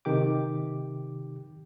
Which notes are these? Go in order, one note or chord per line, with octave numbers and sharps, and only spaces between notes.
C3 D#3 G4 D6